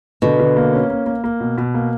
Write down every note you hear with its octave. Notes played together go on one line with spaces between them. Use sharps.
B2 D3
D3
A#3
C#4
A#3
A#3
A#3
B2
B2
A#3